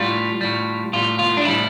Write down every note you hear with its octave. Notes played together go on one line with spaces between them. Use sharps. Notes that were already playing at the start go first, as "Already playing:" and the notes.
Already playing: A2 G3 F4
A2 G3
A2 G3 F4
F4
D4
A2 G3 E4